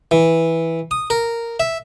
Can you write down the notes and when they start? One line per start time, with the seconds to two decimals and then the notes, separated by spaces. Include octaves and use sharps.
0.11 E3
0.91 D#6
1.10 A#4
1.60 E5